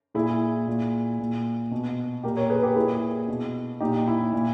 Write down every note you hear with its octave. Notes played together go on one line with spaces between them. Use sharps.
A#2 E4 G#4
A#2
A#2
B2
A#2 G4 A#4
A#4 C#5
G#4 B4
G4 A#4
A#2 E4 G#4
B2
A#2 D#4 G4
E4
A#2